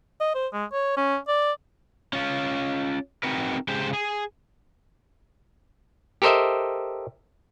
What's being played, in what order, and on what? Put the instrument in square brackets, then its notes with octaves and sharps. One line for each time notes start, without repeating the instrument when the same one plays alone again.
[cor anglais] D#5
C5
G#3
C#5
C#4
D5
[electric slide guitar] C#4 F4
C4 D#4 F#4 A#4 B4
C#3 G#3 G4 C5
G#4
[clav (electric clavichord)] G4 A4 A#4 C5 D#5 E5